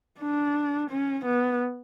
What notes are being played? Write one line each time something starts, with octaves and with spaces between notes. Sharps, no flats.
D4
C#4
B3